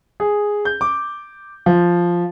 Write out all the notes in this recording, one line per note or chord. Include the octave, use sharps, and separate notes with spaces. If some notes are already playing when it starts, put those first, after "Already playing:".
G#4
G6
D6
F3